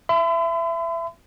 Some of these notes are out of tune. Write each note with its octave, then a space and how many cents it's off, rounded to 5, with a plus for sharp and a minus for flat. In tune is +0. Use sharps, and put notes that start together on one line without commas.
E5 +20 B5 +45